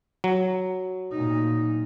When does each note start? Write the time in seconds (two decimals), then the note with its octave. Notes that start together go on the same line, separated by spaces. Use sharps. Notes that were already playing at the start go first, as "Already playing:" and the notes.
0.24 F#3
1.12 A#2 D#4